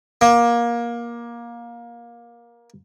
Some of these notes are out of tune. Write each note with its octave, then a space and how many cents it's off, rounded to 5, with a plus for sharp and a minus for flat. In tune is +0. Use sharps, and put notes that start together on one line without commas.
A#3 +20